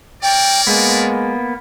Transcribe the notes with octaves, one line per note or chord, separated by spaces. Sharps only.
A#4 C#5 D5 G5
G#3 A#3 B3